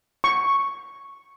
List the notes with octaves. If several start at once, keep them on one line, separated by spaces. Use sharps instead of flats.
C#6